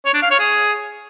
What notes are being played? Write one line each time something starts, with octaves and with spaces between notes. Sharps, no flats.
C#5
D4
F5
C#5
G#4